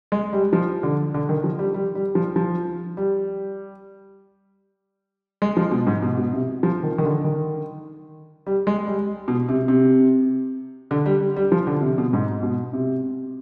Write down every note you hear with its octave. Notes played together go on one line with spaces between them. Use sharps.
G#3
G3
F3
D3
D3
D#3
F3
G3
G3
G3
F3
F3
G3
G#3
F3
B2
G#2
B2
B2
C3
F3
D#3
D#3
D3
D#3
G3
G#3
G3
B2
C3
C3
D3
G3
G3
G3
F3
D3
C3
B2
G#2
B2
C3